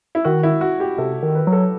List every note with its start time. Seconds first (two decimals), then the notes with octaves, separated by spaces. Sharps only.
0.15 E4
0.25 D#3 F#4
0.43 E4
0.61 F#4
0.80 G4
0.98 C3 A4
1.23 D#3
1.35 B4
1.47 F#3
1.52 A4